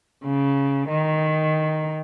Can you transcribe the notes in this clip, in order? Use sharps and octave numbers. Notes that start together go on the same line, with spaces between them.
C#3
D#3